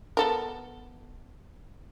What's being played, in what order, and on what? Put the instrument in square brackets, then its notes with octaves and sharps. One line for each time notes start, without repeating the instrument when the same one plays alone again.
[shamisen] B3 A4 A#4